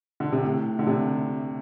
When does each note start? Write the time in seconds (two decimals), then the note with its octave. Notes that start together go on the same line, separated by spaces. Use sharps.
0.20 D3
0.32 C3
0.44 A2
0.79 D3
0.87 C3